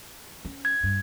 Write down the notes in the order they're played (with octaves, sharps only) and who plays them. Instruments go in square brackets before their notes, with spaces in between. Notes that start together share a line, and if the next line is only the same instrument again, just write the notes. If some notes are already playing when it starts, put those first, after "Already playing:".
[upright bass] C#4
[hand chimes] G#6
[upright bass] G2